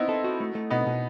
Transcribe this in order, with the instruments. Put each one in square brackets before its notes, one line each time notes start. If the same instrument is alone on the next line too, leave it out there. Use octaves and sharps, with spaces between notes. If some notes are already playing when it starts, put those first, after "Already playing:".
Already playing: [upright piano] B3 C4 D#4 E4
[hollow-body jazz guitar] A4
F#4
A3
A3
[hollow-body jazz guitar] B2 [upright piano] B3 D#4
[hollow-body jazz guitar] B2